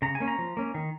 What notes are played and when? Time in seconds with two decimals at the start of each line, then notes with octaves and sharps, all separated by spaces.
0.02 C#3 A#5
0.15 G#5
0.20 A#3 C#4
0.28 A#5
0.39 F3
0.57 A#3 C#4
0.74 D#3